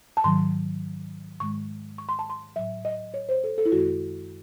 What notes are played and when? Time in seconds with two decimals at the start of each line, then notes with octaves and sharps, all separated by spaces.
0.17 A5
0.24 G#2 D#3 F#3 C6
1.40 G#2 D#3 G#3 C#6
1.98 C#6
2.09 C6
2.19 A5
2.30 C6
2.56 A2 F#3 E5
2.85 D#5
3.14 C#5
3.29 C5
3.44 A4
3.58 A4
3.66 E4
3.72 F#2 D#3 G#3 F#4